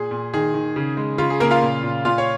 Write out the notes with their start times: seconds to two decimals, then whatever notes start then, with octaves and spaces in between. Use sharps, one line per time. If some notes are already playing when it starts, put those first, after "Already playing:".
Already playing: A#2 G#4
0.11 A#2
0.34 D#3 G#4
0.54 D#3
0.76 C#3
0.97 G#3
1.18 C#3 F4
1.30 G#4
1.40 C#3 A#3 A#4
1.51 F4 F5
1.62 A#2
1.83 A#2
2.05 A#2 F4 F5
2.18 C#5